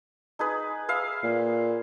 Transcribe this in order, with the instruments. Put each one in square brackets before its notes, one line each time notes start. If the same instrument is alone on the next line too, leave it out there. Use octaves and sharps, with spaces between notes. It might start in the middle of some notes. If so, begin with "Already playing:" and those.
[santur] D#4 G#4 B4
B4 E5 F5
[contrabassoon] A#2